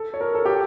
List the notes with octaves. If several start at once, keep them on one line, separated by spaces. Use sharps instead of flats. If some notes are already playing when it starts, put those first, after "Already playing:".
Already playing: A4
C#5
A#4
A4
G4